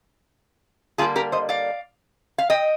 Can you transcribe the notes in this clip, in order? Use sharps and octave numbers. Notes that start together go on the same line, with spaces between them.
D3 G3 A#3 F4 G#4
G4 A#4
C5 D#5
D5 F5
F5
D#5 G5